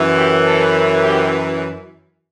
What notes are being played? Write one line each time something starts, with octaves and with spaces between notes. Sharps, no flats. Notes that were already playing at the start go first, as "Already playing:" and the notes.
Already playing: F#2 E3
G4
A4
G4